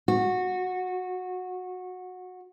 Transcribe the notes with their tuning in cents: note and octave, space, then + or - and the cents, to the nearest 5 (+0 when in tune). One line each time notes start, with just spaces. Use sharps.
F#4 -15